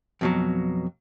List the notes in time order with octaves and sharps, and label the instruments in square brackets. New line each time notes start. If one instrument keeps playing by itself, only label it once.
[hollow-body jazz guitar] F2 B2 F#3